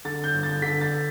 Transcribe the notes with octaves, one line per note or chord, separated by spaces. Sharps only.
D3 A6
G6
G1
A6
D3 B6
A6